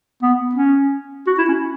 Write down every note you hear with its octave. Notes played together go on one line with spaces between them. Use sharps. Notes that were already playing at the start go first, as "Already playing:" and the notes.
B3
C#4
F#4
E4
C#4